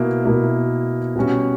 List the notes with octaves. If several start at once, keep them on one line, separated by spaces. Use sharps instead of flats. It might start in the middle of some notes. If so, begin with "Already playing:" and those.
Already playing: B2 A#3 E4
B2 A#3 E4
B2 G3 C#4 F#4